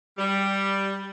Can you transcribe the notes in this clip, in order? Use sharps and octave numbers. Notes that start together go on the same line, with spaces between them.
G3